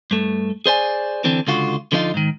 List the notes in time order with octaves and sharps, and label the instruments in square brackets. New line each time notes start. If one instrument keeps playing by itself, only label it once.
[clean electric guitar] G2 A3
G#4 C5 D5 G#5
D3 E3 C4 D4
C#2 D3 F4 F#4
D3 F3 B3 D#4 F4
G#2 D#3